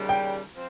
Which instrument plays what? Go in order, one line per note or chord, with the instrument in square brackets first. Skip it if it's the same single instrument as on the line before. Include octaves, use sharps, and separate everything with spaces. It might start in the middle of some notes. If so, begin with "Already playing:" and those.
Already playing: [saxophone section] D#2 C#3 G3
[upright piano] G5
[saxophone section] F3 C4